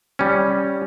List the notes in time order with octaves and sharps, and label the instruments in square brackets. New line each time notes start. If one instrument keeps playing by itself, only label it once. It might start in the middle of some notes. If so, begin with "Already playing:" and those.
[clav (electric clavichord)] G3 C#4